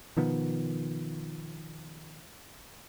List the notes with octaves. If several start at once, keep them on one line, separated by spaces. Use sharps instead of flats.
B2 D#3 F3 B3